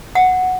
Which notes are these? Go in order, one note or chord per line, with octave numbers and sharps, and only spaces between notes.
F#5